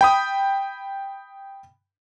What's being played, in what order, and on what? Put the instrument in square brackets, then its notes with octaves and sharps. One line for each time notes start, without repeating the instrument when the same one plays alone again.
[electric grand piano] G5 B5 D#6